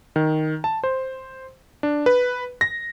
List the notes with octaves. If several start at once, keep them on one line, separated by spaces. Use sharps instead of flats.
D#3
A5
C5
D4
B4
A#6